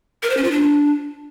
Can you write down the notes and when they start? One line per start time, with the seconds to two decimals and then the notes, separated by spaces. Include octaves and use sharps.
0.23 A#4
0.30 C5
0.37 C#4
0.44 F4
0.51 D4